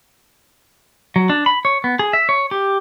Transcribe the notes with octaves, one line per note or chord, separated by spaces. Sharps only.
F#3
D4
B5
C#5
B3
G#4
E5
C#5
G4